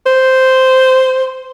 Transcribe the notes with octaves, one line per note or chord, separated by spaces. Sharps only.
C5